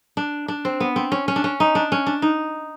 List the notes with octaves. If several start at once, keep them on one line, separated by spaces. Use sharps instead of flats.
D4
D4
C4
B3
C4
C#4
C#4
D4
C#4
D#4
D4
C#4
D4
D#4